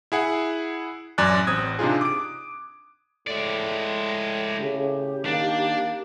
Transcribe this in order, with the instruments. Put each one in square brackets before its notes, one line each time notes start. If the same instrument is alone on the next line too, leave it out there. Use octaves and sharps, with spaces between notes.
[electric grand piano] E4 G#4 F#5
A1 F#2 D5 G#5 F#6
A1 C4 D#6 G#6
C3 D4 D#4 F4 G#4
D6 D7
[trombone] A2 [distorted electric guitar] G#3 D5
[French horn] C#3 [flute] G4
[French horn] D#3 [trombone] A#3 [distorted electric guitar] D4